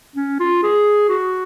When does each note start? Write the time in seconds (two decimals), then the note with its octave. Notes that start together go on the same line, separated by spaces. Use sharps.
0.16 C#4
0.40 F4
0.63 G#4
1.09 F#4